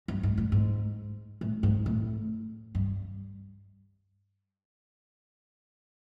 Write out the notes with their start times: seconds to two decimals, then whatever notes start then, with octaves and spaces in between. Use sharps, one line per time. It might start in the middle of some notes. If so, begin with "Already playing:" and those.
0.08 G2
0.23 G#2
0.37 A2
0.52 G#2
1.41 A2
1.63 G#2
1.86 A2
2.75 G2